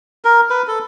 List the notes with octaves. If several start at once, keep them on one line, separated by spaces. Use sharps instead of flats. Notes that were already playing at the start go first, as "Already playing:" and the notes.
A#4
B4
A4